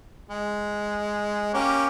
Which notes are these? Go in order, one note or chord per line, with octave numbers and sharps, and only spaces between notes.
G#3
A#3 C#4 G4